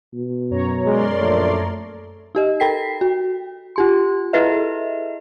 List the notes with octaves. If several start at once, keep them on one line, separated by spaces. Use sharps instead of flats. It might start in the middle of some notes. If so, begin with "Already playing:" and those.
B2
F#2 C#5 A#5
G#3 A#4 D5 C6
A#1 A3
D#4 G4 D#5
A4 A#4 G5 B6 C7
F#4
F4 G4 C6
E4 G#4 A4 B4 D#5 E5